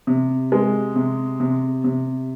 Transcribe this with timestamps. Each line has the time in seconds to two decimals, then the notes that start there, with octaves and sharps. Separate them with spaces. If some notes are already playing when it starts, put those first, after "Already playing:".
0.07 C3
0.52 G#3
0.96 C3
1.40 C3
1.84 C3